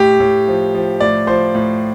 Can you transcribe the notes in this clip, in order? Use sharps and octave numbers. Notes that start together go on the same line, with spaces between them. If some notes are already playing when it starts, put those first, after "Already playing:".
Already playing: A2 G4
A2
F3
F3
A2 D5
F3 C5
A2